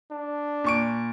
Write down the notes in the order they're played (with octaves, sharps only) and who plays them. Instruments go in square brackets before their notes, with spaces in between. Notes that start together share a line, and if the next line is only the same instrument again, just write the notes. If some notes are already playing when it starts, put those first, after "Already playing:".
[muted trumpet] D4
[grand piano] A#2 C#6 D7